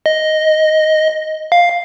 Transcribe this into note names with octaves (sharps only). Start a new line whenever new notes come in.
D#5
F5